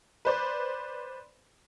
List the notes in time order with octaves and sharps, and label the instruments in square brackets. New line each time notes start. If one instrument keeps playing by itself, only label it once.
[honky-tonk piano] B4 C5 D5